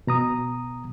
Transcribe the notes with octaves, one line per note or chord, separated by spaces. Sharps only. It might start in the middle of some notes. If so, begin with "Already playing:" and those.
B2 A#5 D#6